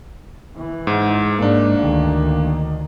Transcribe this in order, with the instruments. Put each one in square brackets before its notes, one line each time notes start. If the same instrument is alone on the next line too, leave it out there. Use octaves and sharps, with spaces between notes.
[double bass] E3
[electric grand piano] G#2
[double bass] G#2 [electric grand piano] A#3 D4
[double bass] D2 D#3